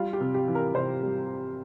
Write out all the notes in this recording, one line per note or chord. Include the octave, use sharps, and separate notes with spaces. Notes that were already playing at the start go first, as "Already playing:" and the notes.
Already playing: G3 F4
G4
C3
G4
E3
A#4
C3 C5
G3